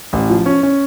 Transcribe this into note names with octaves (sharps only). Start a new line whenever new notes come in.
A1
F3
C#4
C#4